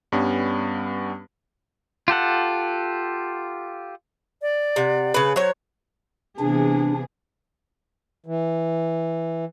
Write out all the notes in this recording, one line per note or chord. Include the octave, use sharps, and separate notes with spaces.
G2 G3 B3 C#4
F4 G4 A4 F#5
D5
C3 F#5
C#3 B4
F#3 C5 C#5
C3 E3 B3 D4 G#4
E3